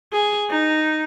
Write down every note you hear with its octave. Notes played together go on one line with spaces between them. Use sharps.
G#4
D#4